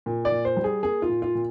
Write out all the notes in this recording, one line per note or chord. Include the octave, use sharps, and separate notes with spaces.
A#2
D5
A#2
C5
G3
G#4
A#3 G#4
F4
A#2
F4
A#2